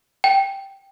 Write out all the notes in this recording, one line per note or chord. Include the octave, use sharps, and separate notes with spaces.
G5